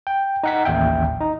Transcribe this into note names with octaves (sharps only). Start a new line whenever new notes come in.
G5
D#4 F#5 B6
A1 D#2 E5 G5
D#4